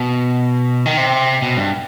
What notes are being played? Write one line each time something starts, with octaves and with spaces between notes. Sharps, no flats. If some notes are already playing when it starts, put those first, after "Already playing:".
Already playing: B2
D#3
C3
B2
G2